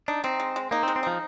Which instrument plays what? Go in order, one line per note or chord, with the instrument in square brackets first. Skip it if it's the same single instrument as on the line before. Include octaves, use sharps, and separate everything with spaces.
[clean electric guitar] D4 [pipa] D#4
[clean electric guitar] C4 [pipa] D#4
[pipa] G#3
G#3
[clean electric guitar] A#3 [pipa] D#4
[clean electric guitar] C4
[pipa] G#3
[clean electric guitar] C4
[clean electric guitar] F3 [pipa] D#4